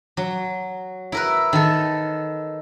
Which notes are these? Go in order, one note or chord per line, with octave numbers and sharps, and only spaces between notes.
F#3
E4 A#4 B4
D#3 A4